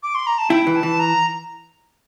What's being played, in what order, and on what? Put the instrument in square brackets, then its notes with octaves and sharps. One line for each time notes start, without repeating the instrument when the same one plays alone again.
[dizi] D6
C6
A#5
A5
[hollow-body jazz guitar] E4 [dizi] G5
[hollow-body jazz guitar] E3
[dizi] A5
[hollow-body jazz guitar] E3
[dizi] A#5